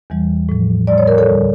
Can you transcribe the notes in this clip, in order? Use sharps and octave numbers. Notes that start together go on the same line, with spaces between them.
E2 E3 G3
A2 F3
A2 G3 D5
C#5
A#4
A4 C#5
D2 D3 G3